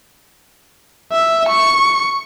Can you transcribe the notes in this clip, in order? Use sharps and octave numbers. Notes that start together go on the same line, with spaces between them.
E5
C#6 C#7